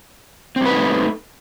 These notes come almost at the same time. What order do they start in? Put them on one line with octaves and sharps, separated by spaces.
C4 G3 B4 D#4 A3